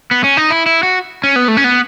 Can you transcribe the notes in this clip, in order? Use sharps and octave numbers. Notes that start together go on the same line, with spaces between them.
B3
C#4
D#4
E4
E4
F#4
C#4
B3
A3
C#4
B3